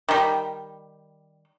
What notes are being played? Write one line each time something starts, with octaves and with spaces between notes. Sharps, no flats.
D#3 G3